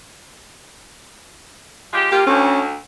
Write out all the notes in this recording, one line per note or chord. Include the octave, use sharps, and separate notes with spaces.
G#3 F4 G4
A#3 F4 G4
D2 C#4